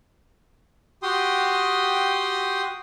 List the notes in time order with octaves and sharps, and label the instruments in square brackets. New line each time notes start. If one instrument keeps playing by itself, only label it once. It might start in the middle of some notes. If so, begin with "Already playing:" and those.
[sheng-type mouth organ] F#4 G4 G5 C6 D#6